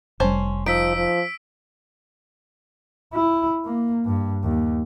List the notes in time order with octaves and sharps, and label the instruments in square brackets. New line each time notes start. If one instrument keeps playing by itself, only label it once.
[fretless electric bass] F1 G3 [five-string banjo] C#4 C5 A5
[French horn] F3 [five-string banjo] D#4 [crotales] E6 B6 D7
[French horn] F3
[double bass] E4
A#3
G2
D#2